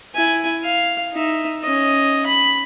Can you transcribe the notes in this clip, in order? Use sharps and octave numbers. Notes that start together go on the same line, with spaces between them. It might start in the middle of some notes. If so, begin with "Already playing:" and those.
E4 G#5
F5
D#4 E5
C#4 D#5
B5